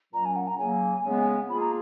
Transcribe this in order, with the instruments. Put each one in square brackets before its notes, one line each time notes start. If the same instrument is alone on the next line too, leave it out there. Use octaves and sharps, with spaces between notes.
[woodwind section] A#2 F#3 C#4 [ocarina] A#5
[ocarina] G#5
F#5
A#5
[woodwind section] C#3 F#3 A#3 [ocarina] G#5
[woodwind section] C#3 G#3 B3
[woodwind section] F3 A#3 F4 G#4 [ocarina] B5
[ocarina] A#5